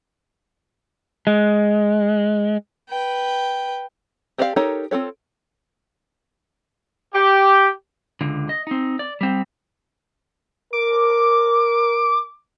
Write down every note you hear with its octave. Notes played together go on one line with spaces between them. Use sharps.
G#3
B4 G5
C4 G4 D5 D#5 F5
D#4 G4 A4 A#4 C#5
C4 F4 A4 C#5
G4
C#2 D3
D#5
C4 D#4
D5
G3 C4
A#4 D6